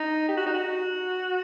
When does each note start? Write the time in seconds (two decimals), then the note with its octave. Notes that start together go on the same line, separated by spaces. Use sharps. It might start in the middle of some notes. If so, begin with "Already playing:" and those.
Already playing: D#4
0.28 G4
0.37 F#4
0.46 D#4
0.54 F#4